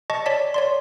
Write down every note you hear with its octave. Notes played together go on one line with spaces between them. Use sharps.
D#5 A5 C#6
C#5 D5 A5 B6
C#5 D5 C6